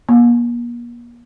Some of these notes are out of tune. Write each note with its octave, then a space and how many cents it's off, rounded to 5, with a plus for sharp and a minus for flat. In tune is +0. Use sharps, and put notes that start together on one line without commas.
A#3 +40